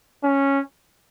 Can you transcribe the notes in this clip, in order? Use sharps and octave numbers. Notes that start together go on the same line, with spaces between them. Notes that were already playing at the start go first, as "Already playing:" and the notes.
C#4